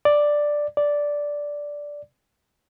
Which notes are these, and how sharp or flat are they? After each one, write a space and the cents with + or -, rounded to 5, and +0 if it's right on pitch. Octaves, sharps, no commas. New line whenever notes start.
D5 +5
D5 -5